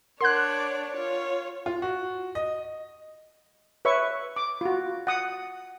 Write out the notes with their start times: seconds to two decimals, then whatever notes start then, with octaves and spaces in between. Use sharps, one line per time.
0.21 D4 A#4 C#5 D5 F#5 C6 F#6 G#6
0.93 F4 C#5
1.66 F4
1.82 F#4
2.35 D#5
3.85 B4 C#5 E5 C#6
4.36 D6
4.61 F4 F#4
5.07 F#5 D#6